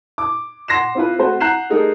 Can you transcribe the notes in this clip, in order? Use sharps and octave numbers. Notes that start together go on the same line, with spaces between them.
D6
F#5 C6 A#6 C7 E7
C4 E4 F4 B4
A3 C4 F#4 B4 C5
F#5 A#5 F#6 G6 C7 E7
G3 A3 D#4 G#4 A#4